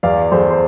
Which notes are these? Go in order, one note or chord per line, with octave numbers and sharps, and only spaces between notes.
E2 D5 F5
E2 A4 C5
C5